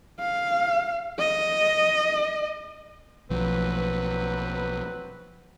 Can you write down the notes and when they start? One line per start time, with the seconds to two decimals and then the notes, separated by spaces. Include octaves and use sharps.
0.20 F5
1.19 D#5
3.30 B1 F3 F#3 C4 B4